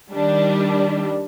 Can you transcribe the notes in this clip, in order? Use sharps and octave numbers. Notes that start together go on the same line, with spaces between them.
D#3 G3 D4